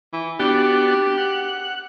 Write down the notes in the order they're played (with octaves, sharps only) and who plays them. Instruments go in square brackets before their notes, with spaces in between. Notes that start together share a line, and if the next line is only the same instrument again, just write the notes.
[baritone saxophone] E3
[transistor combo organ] B3 D4 F#4 [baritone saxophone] G4
[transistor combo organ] F#5